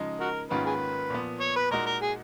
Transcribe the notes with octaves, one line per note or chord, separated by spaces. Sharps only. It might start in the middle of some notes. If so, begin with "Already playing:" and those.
Already playing: C#3 F3 G#3 D#4
F#4 A#4
G#2 D#3 A#3 C#4 F4 B4
G#4 B4
A#2 F3 B3
C#5
B4
A#2 G#3 D#4 F#4 A#4
A#4
G#4